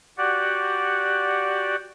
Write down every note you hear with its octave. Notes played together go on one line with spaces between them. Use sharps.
F#4 G4 D5 F#5